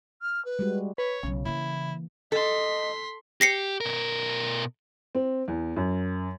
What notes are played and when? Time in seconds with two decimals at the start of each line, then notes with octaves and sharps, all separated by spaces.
0.21 F6
0.44 B4
0.59 G3 G#3 F#4
0.98 B4 C#5
1.23 B1 C#3 F#3
1.45 E3 A#3 E4
2.32 A4 D#5 C6 B6
3.41 G4 A#6 C7 C#7
3.81 B2 A#4
5.15 C4
5.48 E2
5.76 F#2